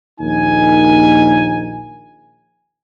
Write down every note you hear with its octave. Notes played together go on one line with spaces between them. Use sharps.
A#1 D#2 D#4 G#5